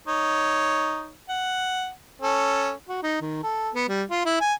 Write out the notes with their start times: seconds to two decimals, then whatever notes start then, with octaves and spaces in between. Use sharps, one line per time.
0.08 D#4 C#5
1.29 F#5
2.22 C#4 A4
2.89 F#4
3.03 D#4
3.21 D#3
3.43 A4
3.75 B3
3.89 G3
4.11 F4
4.25 E4
4.41 G#5